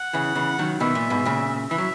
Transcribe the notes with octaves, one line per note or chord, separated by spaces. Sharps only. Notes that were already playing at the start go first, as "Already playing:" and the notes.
Already playing: F#5
C#3 E3
C#3 E3
D#3 F#3
B2 D#3 E5
A#2
G#2 B2
A#2 C#3
E3 E5
F#3